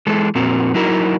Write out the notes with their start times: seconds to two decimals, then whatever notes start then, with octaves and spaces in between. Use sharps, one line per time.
0.07 E3 G#3 A4
0.35 F2 A#2 C4 F#4 A#4
0.74 F#3 D#4 E4 F#4 A#4